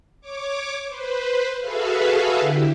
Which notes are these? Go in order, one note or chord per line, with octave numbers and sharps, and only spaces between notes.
C#5 D6
B4 C5
F#4 G#4 A4 B4 E5 F5
D3 E4 G4